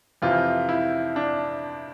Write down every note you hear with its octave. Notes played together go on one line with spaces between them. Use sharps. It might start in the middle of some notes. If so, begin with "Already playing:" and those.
F2 C3 E3 F4
E4
D4